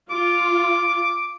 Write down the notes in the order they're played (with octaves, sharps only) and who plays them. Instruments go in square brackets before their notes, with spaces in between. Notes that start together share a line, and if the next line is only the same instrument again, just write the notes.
[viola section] F4 [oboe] D6